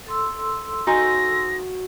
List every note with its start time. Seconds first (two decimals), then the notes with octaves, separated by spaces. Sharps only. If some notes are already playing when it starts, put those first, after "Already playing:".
0.06 A4 C6 E6
0.87 D#4 F#4 G#4 C5 A#6